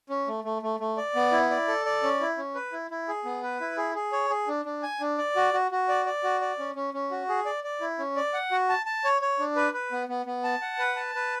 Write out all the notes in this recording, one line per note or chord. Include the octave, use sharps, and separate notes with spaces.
C#4
A3
A3
A3
A3
D5
B3
E4
D5
A4
D5
C#4
E4
C#4
B4
E4
E4
G#4
B3
B4
E4
G#4
G#4
C#5
G#4
D4
D4
G#5
D4
D5
F#4
F#4
F#4
D5
D5
F#4
D5
C#4
C#4
C#4
F#4
G#4
D5
D5
E4
C#4
D5
F#5
F#4
A5
A5
C#5
C#5
D4
B4
B4
B3
B3
B3
A5
F#5
B4
A5
B4